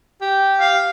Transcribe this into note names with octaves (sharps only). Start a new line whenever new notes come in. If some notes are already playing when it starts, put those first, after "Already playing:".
G4
F5